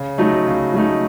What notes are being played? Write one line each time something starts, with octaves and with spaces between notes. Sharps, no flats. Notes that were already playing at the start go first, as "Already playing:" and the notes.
Already playing: C#3
F#3 A3 D#4
C#3
F#3 A3 D#4